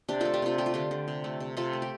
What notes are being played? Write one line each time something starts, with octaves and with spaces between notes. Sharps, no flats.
C3 D4 G4
A3 F4 A4
D4 G4
C3 C4 F4
A3 G4
F4
D3 D4 G4
D3
C3
A3
C3
C3 F4 A4
A3
G4